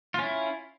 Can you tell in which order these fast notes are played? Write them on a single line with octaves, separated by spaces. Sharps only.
F4 C#4 E4